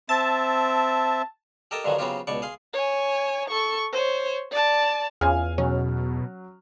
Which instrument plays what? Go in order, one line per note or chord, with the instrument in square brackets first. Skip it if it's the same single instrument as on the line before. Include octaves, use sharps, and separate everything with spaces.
[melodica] C4 E5 [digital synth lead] A5
[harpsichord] G4 A4 A#4 D#5 G5 A5
G2 D3 D#3 F3 F#3
C#3 F#3 B3 C4 F4 G4
C#2 B2 D5 C#6
G#4 F5 C6
[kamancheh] C#5 G#5
A4 C#6
C5 C#5
D5 A5
[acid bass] E2 [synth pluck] C#4 F4 G#4 [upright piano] F5 G#5 F6
[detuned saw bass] B2 [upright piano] F#3 [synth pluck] C#4